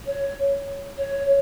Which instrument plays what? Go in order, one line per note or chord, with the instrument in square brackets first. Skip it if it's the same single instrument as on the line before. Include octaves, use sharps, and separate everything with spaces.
[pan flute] C#5
C#5